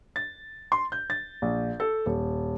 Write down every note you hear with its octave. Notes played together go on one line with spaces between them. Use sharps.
A6
C6
G6
A6
A#1
A4
D#1